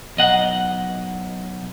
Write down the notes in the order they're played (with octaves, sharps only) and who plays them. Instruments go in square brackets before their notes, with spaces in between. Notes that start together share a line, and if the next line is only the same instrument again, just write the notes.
[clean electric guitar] B1 D#5 F#5